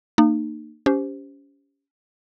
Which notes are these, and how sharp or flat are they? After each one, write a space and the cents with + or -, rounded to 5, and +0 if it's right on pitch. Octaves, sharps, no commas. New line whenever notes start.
A#3 -25 D#4 -35
C#4 +25 G4 +0 C5 -10